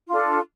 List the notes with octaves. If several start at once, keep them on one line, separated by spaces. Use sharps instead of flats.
D4 F4 A4